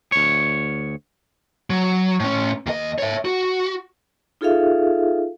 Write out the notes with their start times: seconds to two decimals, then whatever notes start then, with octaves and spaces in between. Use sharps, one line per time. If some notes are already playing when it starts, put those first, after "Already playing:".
0.12 D2 C#5
1.70 F#3
2.20 A2 C#4
2.66 D#2 D#5
2.98 C#5 E5
3.25 F#4
4.41 D#4 F4 G#4 A4 E5 F5